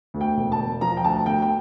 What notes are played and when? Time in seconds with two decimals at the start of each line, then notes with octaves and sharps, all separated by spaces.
0.14 D2
0.21 G5
0.37 E1
0.52 A5
0.59 E1
0.81 F3 A#5
0.97 G5
1.04 D2 A5
1.26 D2 G5
1.42 G5